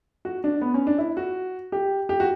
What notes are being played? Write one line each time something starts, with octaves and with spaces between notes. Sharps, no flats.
F#4
D4
B3
C#4
D4
E4
F#4
G4
G4
F#4